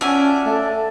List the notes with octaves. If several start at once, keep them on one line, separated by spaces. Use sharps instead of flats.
C#4 D4 F4 F#4 E5 G#5
A3 A4